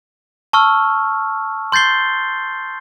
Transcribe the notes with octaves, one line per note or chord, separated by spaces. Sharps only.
A5 C#6 E6 F6
C6 G6 A6 C7 G7